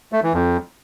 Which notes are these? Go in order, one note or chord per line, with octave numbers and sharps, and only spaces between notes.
A3
E3
F2